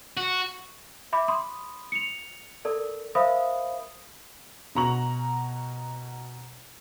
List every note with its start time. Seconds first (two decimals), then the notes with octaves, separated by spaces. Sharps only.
0.17 F#4
1.13 E5 B5 D6
1.28 B5 C6 D#6
1.92 C#7 F7
2.65 A4 A#4 D5
3.15 A#4 C5 E5 F5 B5 D#6
4.75 B2 F#4 A#5 C#6 F#7